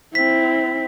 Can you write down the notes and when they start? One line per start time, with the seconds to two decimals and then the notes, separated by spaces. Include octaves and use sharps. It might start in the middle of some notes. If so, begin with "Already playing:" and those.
0.15 C4 E4 B6